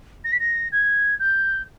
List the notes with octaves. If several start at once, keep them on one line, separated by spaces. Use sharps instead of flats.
A#6
B6
A#6
G#6
G6